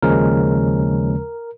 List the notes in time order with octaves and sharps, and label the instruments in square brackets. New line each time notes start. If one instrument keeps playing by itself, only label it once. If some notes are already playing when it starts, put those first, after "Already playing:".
[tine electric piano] D#2 C#3 F3 G#3 C#4 A#4